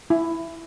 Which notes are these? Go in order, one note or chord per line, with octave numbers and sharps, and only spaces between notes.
E4